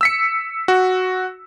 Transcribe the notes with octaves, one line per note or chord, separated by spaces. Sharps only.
E6 B6 C#7
F#4